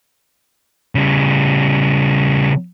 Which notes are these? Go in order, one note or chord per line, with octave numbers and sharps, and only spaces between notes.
C#3 G3